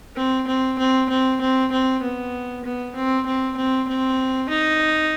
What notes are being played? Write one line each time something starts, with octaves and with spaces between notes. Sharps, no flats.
C4
C4
C4
C4
C4
C4
B3
B3
C4
C4
C4
C4
D#4